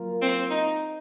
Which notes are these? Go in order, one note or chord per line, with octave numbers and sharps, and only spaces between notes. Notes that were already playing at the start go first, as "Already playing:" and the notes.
Already playing: F#3 A#3 F4 A#4
C4
D#4